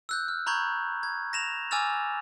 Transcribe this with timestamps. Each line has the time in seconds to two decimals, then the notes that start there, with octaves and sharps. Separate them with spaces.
0.09 E6 F#6 G6
0.28 F6
0.47 A#5 B5 C#6 G6 G#6
1.03 G#6
1.33 A#6 E7 F7
1.71 G#5 D6 E6 F6 A6 F7